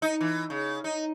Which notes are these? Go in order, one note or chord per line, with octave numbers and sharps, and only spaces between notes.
D#4
E3
C#3
D#4